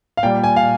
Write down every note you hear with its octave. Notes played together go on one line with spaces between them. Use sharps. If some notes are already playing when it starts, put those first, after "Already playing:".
F5
A#2 G3 G5
G#5
F5